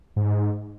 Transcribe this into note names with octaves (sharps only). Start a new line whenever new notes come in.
G#2